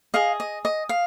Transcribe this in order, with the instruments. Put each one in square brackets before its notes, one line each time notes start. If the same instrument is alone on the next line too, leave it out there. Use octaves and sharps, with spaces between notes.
[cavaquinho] G#4 D#5 F5
D#5
D#5
F5